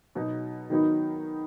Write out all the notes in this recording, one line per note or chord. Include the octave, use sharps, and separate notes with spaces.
B2 F#3 B3 D#4
D#3 F#3 B3 D#4